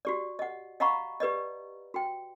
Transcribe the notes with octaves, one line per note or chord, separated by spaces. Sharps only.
F#4 G4 D5
D#5 F#5
D#5 F5 F#5 A#5 B5 C#6
G4 B4 D5 D#5
F#4 G5